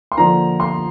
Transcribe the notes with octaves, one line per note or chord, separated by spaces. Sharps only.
C6
D3 F3 A#3 A#5
C6